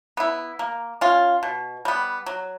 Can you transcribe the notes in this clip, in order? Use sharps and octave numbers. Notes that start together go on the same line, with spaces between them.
B3 E4
A#3
C#4 F4
B2
G3 B3
F#3